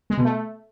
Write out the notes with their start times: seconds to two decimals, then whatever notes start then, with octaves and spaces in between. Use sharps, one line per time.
0.10 G#3
0.17 B2
0.25 A3